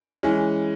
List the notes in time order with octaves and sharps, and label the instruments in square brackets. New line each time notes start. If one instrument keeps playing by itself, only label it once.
[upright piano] E3 G#3 C#4